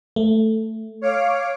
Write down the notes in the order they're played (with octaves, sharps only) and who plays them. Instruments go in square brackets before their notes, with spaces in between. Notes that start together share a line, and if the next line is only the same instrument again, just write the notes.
[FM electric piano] A3
[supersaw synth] C#5 F5 D6